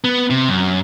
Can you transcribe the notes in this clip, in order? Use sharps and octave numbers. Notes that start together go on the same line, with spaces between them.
B3
C3
F#2